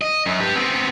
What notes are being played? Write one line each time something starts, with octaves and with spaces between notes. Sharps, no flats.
D#5
F#2
G4 B4
B3 C4